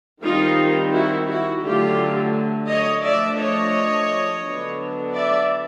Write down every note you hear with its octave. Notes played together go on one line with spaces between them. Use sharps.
D#3 G3 C4 D#4 F4
E4 F#4
E4 F#4
D3 F#3 A3 F4 G4
C#5 D#5
F3 A3 D4 D5 E5
C#5 D#5
D3 F#3 B3 D4
D5 E5